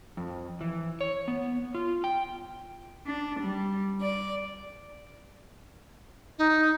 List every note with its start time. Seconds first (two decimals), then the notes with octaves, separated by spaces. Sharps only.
0.17 F2
0.61 E3
1.01 C#5
1.28 B3
1.75 F4
2.04 G5
3.06 D4
3.39 G3
4.02 D5
6.38 D#4